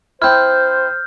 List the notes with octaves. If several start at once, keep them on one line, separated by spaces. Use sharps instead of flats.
C4 E4 C5 F6 G6